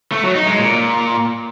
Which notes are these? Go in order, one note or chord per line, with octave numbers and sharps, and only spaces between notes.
A3
F#3
D#4
G#3
A#2